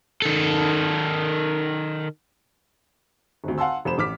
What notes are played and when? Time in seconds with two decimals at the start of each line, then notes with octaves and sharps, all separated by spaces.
0.22 D#3 A4
3.44 G#1 D2
3.58 F5 F#5 G#5 A5 C6 E6
3.85 F1 C5 B5 E7
3.98 A1 D6 F6 B6